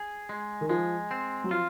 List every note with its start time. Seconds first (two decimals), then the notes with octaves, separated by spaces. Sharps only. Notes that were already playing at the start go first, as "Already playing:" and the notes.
Already playing: G#4
0.29 G#3
0.61 D#3
0.69 F3 G#3
1.11 C4
1.44 F#3
1.51 F3 F4